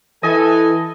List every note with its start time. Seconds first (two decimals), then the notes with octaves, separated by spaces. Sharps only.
0.23 E3 A4 D#5 G#5 A5